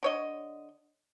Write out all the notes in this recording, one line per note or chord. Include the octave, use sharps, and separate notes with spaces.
D3 C#5 D#5